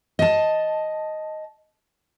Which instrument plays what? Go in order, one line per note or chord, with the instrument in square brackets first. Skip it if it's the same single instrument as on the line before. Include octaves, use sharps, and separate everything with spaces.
[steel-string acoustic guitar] D#5 A5